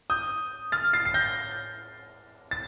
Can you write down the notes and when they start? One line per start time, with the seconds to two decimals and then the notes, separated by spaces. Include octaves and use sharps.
0.10 D#6 G6
0.72 F6 A6
0.93 A6 C7
1.05 C7
1.14 G6 A#6
2.51 A6